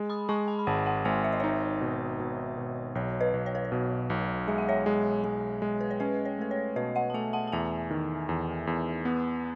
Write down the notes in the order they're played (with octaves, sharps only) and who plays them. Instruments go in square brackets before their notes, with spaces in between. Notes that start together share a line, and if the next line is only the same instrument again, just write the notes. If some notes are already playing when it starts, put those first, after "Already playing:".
Already playing: [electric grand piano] G#3
[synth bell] B5 D#6
[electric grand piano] G#3 [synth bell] A5 C#6
[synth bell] G#5 B5
B5
[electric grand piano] G#1 [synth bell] F#5 A5
[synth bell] F#5 A5
[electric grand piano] G#1 [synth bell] E5 G#5
[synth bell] E5
D#5
[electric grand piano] D#4 [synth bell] C#5 E5
[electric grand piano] B2
B2
B2
[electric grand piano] B1 [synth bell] C#5
[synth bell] B4 D#5
[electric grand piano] B1
[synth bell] C#5
B4
C#5
[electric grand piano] B2
B1
[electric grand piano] G#3 [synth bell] E5
[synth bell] F#5
C#5 E5
[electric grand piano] G#3
G#3
G#3
[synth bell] B4
C#5
[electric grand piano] C#4 [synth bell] B4 D#5
[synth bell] C#5
[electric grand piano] A3 [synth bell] B4
[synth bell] C#5
[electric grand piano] B2 [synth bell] B4 D#5
[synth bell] D#5 F#5
A5
[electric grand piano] A3 [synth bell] E5 G#5
[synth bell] F#5 A5
A5
[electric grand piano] E2 [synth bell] E5 G#5
[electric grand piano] D#3
E2
E2
B3